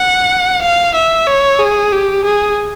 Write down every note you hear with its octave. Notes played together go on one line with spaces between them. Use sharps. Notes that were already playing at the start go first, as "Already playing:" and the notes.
Already playing: F#5
F5
E5
C#5
G#4
G4
G#4